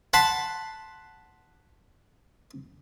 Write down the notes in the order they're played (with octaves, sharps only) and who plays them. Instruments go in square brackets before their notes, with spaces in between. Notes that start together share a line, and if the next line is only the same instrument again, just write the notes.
[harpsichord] F#5 A5 B5 C6